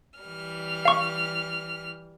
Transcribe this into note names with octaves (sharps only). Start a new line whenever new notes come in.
E3 G3 F6
F5 C#6